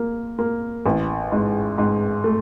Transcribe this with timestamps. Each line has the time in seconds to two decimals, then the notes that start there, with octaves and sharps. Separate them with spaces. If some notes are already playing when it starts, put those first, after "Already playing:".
Already playing: A#3
0.39 A#3
0.86 A1
1.32 G#2
1.78 G#2
2.24 A3